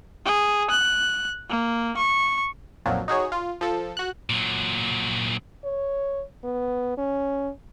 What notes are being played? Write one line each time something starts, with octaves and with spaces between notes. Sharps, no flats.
G#4
F#6
A#3
C#6
B1 F2 A#2 F3 F#3
D#4 F#4 G#4 C#5
F4
F3 A4
F#4 F#6
A#2 F#3
C#5
B3
C#4